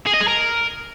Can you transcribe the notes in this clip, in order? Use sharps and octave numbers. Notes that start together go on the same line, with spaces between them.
G#4
D#5
G#4
A#4